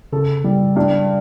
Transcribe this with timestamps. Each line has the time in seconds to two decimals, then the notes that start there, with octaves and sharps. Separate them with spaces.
0.13 C#3 A4
0.44 G3
0.76 G2